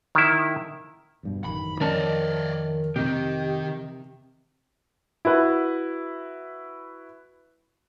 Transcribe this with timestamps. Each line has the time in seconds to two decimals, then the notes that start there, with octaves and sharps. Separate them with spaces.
0.15 D#3 E4
1.23 E2 G2 B2
1.44 A1 F#2 D#3 B5
1.81 F2 D#3 C#4 A#4 D5 D#5 A5
2.96 C3 D#3 G4
5.25 E4 F#4 B4